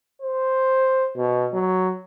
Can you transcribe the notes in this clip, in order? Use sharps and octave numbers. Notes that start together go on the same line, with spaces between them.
C5
B2
F#3